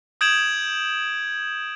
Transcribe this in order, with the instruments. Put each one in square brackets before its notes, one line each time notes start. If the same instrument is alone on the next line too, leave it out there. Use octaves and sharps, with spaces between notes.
[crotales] D#6 G6 G#6 D7 E7 F#7